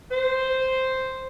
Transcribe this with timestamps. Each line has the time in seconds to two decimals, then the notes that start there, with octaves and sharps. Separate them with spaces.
0.11 C5